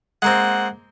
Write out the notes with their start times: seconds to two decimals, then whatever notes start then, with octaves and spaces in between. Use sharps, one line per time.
0.22 G#3 A#3 C4 F#5